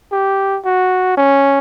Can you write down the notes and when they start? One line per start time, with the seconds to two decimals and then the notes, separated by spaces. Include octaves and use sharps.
0.12 G4
0.65 F#4
1.17 C#4